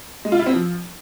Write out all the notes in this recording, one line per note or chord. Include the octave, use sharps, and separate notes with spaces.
G#3
F4
E4
C4
F3